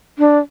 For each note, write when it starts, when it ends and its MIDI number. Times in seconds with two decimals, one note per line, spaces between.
0.19 0.38 62